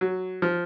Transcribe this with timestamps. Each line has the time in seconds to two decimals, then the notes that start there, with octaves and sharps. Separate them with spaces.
0.01 F#3
0.42 F3